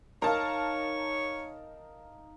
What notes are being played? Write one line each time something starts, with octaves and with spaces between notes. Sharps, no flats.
D#4 A#4 C#5 F5 A5